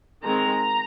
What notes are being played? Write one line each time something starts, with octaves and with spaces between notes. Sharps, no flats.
D#3 G#3 C4 A#5